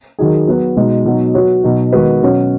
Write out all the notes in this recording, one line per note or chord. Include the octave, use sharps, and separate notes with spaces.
D#3 F#3 D#4 G#4
F#3 B3 F#4 B4
B2 G#3 D#4
B2 F#3 D#4
F#3 B3 F#4 C#5
B2 F#3 D#4
D#3 G#3 B3 F#4 B4
B2 F#3 C#4 F#4 C#5